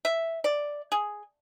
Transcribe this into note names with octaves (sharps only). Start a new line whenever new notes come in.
E5
D5
G#4